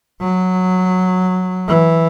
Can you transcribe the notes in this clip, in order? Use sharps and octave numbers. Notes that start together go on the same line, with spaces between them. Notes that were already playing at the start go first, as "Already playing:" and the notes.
F#3
E3